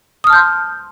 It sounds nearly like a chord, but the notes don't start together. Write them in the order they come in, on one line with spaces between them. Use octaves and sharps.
D#6 F6 A5 G6 C6